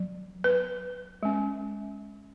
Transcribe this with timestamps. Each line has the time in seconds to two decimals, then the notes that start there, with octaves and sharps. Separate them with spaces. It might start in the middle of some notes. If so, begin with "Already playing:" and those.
Already playing: F#3
0.44 B4
1.23 G#3 C#4